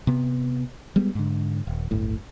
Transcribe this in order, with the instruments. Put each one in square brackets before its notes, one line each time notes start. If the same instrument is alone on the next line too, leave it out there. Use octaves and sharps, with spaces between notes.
[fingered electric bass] C3 B3
G3 G#3 B3
G#2 D3
D#1
D1 G1 A2